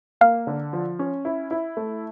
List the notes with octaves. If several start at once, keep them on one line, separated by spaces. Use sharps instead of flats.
A#3 F5
D3
F3
C#4
E4
E4
A3